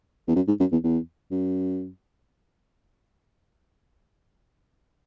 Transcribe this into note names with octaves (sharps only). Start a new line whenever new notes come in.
E2
F#2
G#2
F#2
E2
E2
F#2